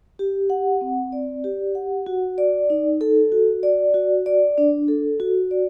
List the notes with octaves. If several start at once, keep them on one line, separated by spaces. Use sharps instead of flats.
G4
F#5
C4
D5
G4
F#5
F#4
D5
D#4
A4
F#4
D5
F#4
D5
D4
A4
F#4
D5